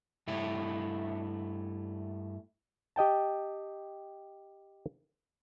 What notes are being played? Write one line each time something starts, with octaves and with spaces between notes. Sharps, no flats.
G2 A3 E4
G4 D#5 G5 A5